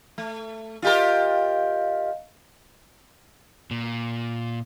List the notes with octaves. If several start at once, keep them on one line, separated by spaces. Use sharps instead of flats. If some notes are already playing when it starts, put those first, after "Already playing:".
A3
F4 G4 A#4 D#5 F5
A#2